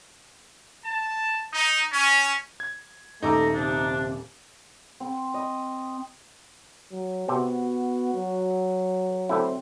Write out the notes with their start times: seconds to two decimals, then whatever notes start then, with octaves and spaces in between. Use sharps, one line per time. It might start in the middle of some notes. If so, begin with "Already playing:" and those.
0.84 A5
1.53 D#4
1.93 C#4
2.60 G#6
3.23 D#1 A3 D#4 A#5 D6 E6
3.54 C3 D4
5.00 C4
5.34 D#5
6.91 F#3
7.28 C3 B3 C4 F#4
8.14 F#3
9.29 D3 A3 C4 E4